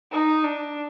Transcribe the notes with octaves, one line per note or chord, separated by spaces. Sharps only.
D#4
D4